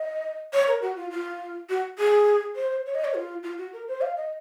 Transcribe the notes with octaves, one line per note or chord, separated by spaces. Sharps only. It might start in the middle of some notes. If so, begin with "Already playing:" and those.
Already playing: D#5
C#5
A#4
F#4
F4
F4
F#4
G#4
C5
C#5
D#5
C#5
F4
F4
F#4
A#4
C5
F5
D#5